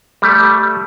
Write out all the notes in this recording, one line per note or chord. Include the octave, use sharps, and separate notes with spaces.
G3 A3